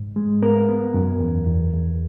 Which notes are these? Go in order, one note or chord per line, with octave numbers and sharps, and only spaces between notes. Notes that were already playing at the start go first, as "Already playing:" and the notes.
Already playing: G#2
G#3
B3 A#4
B3
F#2
E2
E2
E2